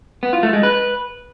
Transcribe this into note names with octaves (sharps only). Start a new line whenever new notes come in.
B3
F4
A3
G#3
B4